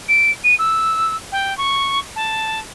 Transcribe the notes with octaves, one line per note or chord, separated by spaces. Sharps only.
D7
D#7
E6
G5
C#6
A5